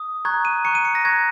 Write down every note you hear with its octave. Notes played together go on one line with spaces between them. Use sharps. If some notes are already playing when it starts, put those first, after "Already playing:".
Already playing: D#6
A#5 C#6 F#6 G#6
D#7
A#5 C#6 F#6 C#7
D#7
C#7
A#6
A#5 C#6 F#6 G#6